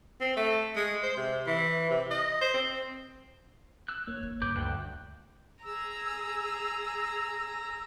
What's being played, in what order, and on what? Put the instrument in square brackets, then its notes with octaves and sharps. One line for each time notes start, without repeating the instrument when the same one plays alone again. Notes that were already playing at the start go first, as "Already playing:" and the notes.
[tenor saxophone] C4
A3
G#3
C5
C3
E3
C3
D#5
C5
C4
[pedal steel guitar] E6 F#6
[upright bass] D#3 [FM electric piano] A#3 [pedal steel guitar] C#5
[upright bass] G#1 D#2
[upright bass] C#2 G2 [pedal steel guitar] B4 D6 G6
[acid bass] D2 [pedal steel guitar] G5 A5 F#6
[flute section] G#4 E6 [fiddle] A#5